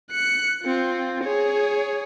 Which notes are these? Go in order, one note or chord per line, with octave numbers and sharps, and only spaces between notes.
F#6 C#7
C4 F4
G#4 C#5